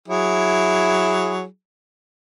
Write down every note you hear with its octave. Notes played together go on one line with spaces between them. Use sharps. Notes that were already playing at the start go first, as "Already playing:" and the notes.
F#3 E4 G#4